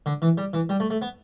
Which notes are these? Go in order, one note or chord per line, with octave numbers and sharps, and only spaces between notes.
D3
E3
G3
E3
G3
A3
A3
B3